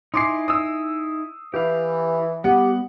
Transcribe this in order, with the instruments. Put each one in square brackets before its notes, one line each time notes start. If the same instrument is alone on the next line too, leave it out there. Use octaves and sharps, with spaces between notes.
[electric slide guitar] D#4 E4 G#5 [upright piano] C6 D6 C7
[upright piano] D#6 E6
[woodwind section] E3 [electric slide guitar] G4 F5
[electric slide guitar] G3 B3 [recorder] G4 [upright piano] F#5